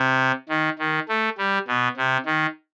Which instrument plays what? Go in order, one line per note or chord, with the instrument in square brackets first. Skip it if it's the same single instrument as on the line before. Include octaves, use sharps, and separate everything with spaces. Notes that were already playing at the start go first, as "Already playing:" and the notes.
Already playing: [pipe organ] C3
D#3
D#3
A3
G3
B2
C3
D#3